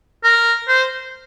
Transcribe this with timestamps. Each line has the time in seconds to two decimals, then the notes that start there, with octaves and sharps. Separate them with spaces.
0.24 A#4
0.68 C5